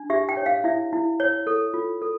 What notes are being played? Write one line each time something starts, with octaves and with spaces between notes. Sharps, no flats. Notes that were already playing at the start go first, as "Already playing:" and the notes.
Already playing: D4
G4 E5
G5
C#5
F5
E4 E5
E4
C#5
A4
F4
A4